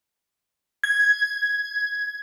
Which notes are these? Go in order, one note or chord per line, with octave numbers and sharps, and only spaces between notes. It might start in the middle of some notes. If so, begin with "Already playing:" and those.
G#6